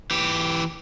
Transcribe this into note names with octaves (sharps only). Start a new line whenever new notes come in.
E3 G4